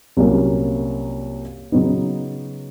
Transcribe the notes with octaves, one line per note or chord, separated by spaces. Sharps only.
C2 A#2 F#3 A#3 C#4
C#3 F#3 B3 D#4